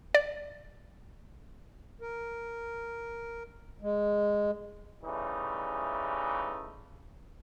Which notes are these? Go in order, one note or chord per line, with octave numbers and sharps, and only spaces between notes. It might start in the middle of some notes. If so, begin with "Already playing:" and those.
D5
A#4
G#3
C#3 E3 G3 A3 D#4